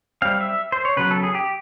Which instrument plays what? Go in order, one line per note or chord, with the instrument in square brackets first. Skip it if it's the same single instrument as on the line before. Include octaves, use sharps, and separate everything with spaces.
[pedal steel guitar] G3 C4 F5
E5
C5
C#5
C#3 F#3 B3 B4
A4
G#4
G4